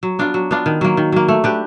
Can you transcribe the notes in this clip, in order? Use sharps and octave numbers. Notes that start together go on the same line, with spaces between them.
F#3
B3 D4 F4
F#3
B3 D4 F4
D#3
F#3 A#3
D#3
F#3 A#3
A3
D4 G4 B4